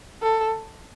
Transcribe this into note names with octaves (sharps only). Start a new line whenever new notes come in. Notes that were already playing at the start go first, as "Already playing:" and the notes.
A4